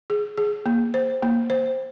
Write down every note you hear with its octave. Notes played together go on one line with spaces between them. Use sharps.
G#4
G#4
A#3
C5
A#3
C5